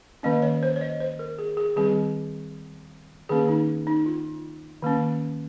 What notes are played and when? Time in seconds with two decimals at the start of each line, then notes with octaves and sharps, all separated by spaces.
0.23 D#3 A#3 C#4 D#5
0.42 C#5
0.63 C5
0.76 C#5
0.81 D#5
1.00 C5
1.19 A#4
1.38 G#4
1.57 G#4
1.76 D#3 G3 C4 G#4
3.29 D#3 A#3 C#4 G#4
3.48 D#4
3.87 D#4
4.06 F4
4.82 D#3 A#3 C#4